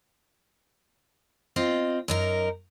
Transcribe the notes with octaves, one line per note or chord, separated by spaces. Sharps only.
C4 F4 D#5
F#2 D#4 A#4